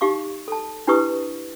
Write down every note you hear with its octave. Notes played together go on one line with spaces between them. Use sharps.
D#4 G4 F5 C#6 D6
A4 A5
D4 E4 G4 B4 C#6 D#6